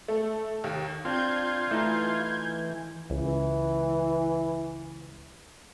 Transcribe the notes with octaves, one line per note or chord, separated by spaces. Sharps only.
A3
D#2
C4 D4 F4 G6 G#6
E3 A3 D#4
C#2 E3